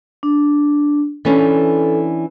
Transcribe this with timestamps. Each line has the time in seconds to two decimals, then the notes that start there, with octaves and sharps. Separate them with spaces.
0.23 D4
1.25 E3 C#4 D4 A4